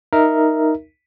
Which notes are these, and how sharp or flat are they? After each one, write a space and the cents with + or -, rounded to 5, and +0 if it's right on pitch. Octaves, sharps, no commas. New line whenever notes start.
D#4 +0 A#4 +0 E5 +0